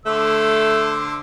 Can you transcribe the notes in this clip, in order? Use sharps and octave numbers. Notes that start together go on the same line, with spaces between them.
D3 A3 C5 E6